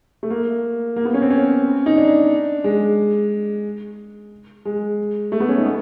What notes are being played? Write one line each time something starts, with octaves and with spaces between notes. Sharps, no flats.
A3
A#3
A#3
B3
C#4
C4
C#4
D#4
D4
G#3
G#3
A3
B3
C#4
D#4
B3